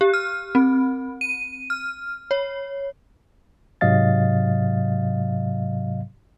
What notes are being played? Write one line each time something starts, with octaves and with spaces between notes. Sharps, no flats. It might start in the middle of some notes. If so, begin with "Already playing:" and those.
G4
F6
C4
D#7
F6
C#5
G#2 C3 F#3 D#5 F5 A6